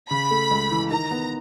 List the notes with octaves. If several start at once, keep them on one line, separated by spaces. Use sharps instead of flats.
C#3 B5
A3
C#2
E3
D#3 A#5
B3